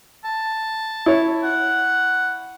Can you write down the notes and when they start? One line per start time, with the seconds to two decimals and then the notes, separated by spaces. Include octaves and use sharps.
0.25 A5
1.06 E4 C#5
1.44 F#5